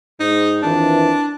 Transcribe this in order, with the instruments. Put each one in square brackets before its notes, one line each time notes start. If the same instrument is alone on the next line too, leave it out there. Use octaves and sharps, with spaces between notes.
[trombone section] G#2 [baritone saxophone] D#4
[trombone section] F2 D#3 E3 [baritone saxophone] D4